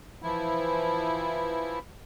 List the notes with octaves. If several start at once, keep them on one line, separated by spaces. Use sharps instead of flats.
E3 F3 E4